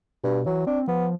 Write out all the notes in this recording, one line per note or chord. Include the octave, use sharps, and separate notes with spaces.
G2 B2
E3 F#3
C4 D4
F3 B3